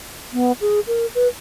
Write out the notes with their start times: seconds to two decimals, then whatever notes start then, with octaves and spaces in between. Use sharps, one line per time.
0.33 B3
0.61 G#4
0.87 A#4
1.15 B4